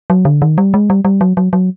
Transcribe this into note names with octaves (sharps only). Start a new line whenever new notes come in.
F#3
D3
D#3
G3
G#3
G3
G3
F#3
F#3
F#3